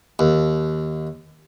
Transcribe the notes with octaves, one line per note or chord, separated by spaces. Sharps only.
D#2